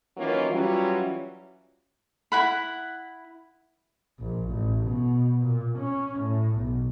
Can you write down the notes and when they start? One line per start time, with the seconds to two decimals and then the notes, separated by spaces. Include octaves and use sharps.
0.17 D#3 E3 F#3 A#3 C#4 F4
0.50 E3 F#3 G3 C#4 F4 F#4
2.32 E4 F#5 B5
4.19 A#1
4.50 A1
4.87 B2
5.43 A#2
5.79 C#4
6.20 A2
6.57 B1